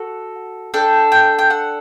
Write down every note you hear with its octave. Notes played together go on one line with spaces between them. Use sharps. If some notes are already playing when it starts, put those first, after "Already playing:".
Already playing: F#4 A4 F#5
D4 A4 G5
G5
G5
F#5